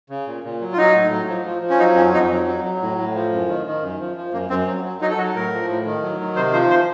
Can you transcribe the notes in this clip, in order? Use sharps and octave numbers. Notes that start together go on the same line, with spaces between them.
C#3
A#2
A#2
F#3
F4
F#3 D#4
A2
F#3
F3
F3
F3
C#4
F#3 D#4
F2 C#4
F2 D#4
F#3
F#3
F#3
A2
A2
F3
F#2
D#3
D#3
F#2
F3
F3
F#2 A#3
F#2 C4
F#3 C4
F#3
F#3 D#4
A4
F#3 F#4
A2 A#4
F3
A2
D#3
F#3
D#3
C3 C5
F3 C5
C5